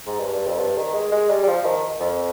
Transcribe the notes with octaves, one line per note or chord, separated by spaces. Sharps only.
G#2
G2
G2
F2
G2
D#3
G#3
G#3
G3
G3
F3
D#3
F2